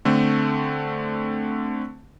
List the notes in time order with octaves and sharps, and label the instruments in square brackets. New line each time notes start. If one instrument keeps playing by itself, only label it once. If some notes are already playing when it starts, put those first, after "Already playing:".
[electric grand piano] D3 A3 C4